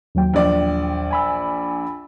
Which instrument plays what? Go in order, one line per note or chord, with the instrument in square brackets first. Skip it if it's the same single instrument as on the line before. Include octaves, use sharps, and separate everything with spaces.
[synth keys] D#2 F#3 G5
[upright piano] A#1 D5
[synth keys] G#5 B5 E6